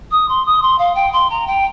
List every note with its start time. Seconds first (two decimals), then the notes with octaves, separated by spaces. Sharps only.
0.11 D#6
0.29 C6
0.45 D#6
0.62 C6
0.79 F5
0.95 G5
1.12 C6
1.30 A#5
1.47 G5